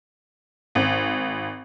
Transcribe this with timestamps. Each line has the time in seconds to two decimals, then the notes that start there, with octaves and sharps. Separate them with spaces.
0.75 G#1